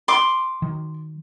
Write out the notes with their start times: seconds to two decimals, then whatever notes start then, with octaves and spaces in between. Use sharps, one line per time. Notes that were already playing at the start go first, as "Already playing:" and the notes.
0.08 C6 D6
0.62 D#3 F#3